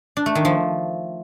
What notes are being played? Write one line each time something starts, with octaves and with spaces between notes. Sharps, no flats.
D4
A3
D#3
F3